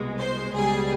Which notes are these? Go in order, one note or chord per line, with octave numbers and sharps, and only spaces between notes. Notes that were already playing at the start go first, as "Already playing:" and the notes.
Already playing: C2 B2 G#3
C5
C#2 B2 G3 G#4